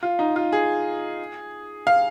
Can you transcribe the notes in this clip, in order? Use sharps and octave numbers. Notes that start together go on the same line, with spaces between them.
F4
D#4
F4
G#4
F5